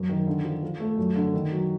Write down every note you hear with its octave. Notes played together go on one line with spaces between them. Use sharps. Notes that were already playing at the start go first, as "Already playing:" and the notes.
Already playing: F#2
D#3
D3
F3
F3
A3
F#2
D3
D#3
F#3